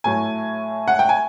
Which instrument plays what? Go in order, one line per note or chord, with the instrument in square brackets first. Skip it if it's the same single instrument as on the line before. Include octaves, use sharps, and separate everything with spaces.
[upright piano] A2 F#3 A3 G#5
F#5
G5
G#5